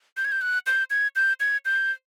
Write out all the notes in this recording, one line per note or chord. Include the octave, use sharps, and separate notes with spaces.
G6
G#6
G6
F#6
G6
G#6
G6
G#6
G6